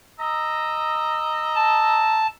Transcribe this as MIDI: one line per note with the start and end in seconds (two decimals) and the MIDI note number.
0.20 2.33 75
0.20 2.33 82
0.20 2.33 88
1.55 2.27 81